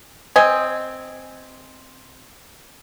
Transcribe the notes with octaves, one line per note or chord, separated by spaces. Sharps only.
C4 D#5 G#5